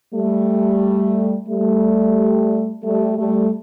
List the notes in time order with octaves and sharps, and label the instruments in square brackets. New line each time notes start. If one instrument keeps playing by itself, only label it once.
[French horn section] G3 A3
G3 A3
G3 A3
G3 A3